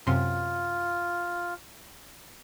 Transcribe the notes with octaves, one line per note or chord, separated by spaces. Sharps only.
F#2 C3 F4 C6